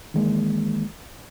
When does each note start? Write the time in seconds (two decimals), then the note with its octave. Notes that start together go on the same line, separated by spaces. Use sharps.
0.14 D#3 E3 G#3 A#3